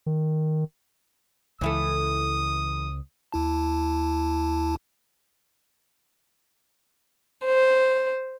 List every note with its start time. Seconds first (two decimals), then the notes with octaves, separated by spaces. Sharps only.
0.06 D#3
1.61 C#2 E3 E4 A4 D#6
3.32 D#2 E4 A5
7.45 C5